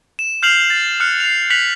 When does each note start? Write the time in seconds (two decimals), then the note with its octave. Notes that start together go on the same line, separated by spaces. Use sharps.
0.19 E7
0.43 F6 G6 C7 F7 F#7
0.70 A6
1.00 F6 F#6 C#7 E7
1.20 C7 F7
1.50 F#6 B6 C#7 F7 F#7